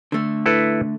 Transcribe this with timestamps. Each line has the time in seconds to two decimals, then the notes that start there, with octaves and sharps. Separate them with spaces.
0.12 D3 A3
0.46 E4 A4 B4